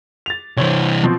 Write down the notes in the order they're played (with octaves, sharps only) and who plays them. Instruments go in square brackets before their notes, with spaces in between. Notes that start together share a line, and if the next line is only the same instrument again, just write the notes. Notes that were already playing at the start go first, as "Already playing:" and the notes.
[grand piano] A6 F7
[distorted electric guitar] C2 E3 [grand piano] C5 C#5
[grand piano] B2 F3 C4